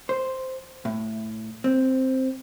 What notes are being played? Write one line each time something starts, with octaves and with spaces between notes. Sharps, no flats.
C5
A2
C4